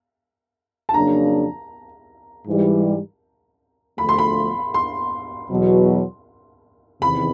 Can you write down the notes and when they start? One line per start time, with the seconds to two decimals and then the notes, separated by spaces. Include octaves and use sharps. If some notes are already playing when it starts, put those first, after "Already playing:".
0.89 A5
0.94 F2 C#3 F#3 A#3 D4 A#5
2.47 G#2 E3 G3
3.98 D2 D3 F3 A3 B5
4.09 C6
4.18 B5
4.74 C6
5.50 E2 B2 F#3
7.02 E2 C3 D#3 B5